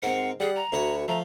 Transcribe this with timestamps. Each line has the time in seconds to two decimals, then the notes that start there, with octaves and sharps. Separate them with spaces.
0.03 G#2 C4 A#4 F#5
0.40 G3 G#4 F#5
0.56 A#5
0.72 D2 E4 F#4 C#5
1.08 F3 A3 A#5